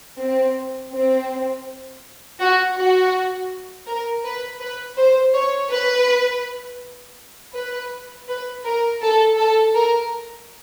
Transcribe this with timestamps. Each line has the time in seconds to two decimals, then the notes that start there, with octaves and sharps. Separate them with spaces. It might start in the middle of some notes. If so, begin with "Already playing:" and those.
0.19 C4
0.92 C4
2.40 F#4
2.76 F#4
3.87 A#4
4.24 B4
4.60 B4
4.97 C5
5.34 C#5
5.70 B4
7.55 B4
8.28 B4
8.65 A#4
9.02 A4
9.38 A4
9.75 A#4